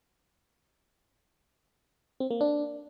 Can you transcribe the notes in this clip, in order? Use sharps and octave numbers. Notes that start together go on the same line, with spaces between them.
C4
A#3
D4